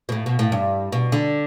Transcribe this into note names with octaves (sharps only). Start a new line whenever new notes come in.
B2
A2
B2
A2
G2
B2
D3